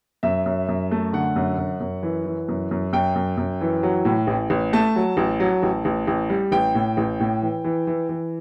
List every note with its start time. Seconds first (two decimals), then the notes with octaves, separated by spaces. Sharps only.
0.23 F#2 E5
0.46 F#2
0.69 F#2
0.91 A3
1.13 D3 F#5
1.36 F#2
1.58 F#2
1.80 F#2
2.03 E3
2.26 E3
2.48 F#2
2.71 F#2
2.93 F#2 G5
3.15 F#2
3.37 F#2
3.61 E3
3.83 F#3
4.05 A2
4.27 A1
4.50 A1
4.73 A3 A5
4.96 F#3
5.17 A1
5.40 F#3
5.63 A1
5.85 A1
6.07 A1
6.30 G3
6.52 A1 G5
6.75 A2
6.97 A1
7.20 A2
7.42 E3
7.64 E3
7.87 E3
8.09 E3